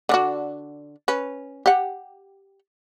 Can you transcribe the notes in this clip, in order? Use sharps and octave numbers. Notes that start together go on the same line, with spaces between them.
D3 D4 F#4
C#4 B4
G4 F#5